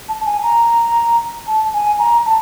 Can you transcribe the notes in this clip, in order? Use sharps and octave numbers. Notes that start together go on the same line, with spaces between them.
A5
G#5
A#5
A5
G#5
A#5
A5